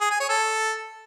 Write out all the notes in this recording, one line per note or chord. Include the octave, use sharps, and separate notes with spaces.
G#4
G#5
C#5
A4